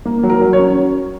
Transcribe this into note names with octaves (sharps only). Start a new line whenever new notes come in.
A#3
F#3
A#4
F#3
C#5
C#4